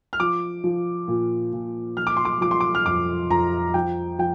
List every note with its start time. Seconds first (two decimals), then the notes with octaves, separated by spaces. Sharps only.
0.13 F6
0.20 F3 D6
0.64 F3
1.08 A#2
1.53 A#2
1.97 F3 F6
2.07 D6
2.17 C6
2.25 D6
2.41 F3 D6
2.51 C6
2.60 D6
2.75 F6
2.86 F2 D6
3.30 F2 A#5
3.74 F3 G5
4.19 F3 G5